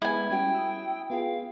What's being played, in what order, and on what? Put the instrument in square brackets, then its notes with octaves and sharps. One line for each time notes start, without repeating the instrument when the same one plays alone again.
[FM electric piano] G#3 B3 [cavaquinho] E4 G#5
[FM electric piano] G3 C#4 F#4 [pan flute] G5
[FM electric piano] D#6 E6
[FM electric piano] B3 F4 G#4 [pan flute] F5